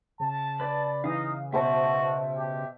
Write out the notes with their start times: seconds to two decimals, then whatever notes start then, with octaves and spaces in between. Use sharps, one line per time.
0.20 C#3 A5
0.60 B4 D5
1.04 E3 D#4 F5 D#6
1.52 B2 F#4 C5 E5 A5
2.34 G4